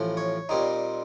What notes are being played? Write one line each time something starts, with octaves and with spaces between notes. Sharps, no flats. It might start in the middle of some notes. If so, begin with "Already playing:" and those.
Already playing: A1 A2 F3
C#5
A#2 G3 C4 D#4